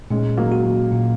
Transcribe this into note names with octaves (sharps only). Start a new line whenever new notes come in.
A#2 G#3 C#4
F#3 A#3
F#4
F#3
A#2